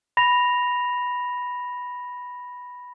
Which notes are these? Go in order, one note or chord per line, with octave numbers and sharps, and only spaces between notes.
B5 A#6 F7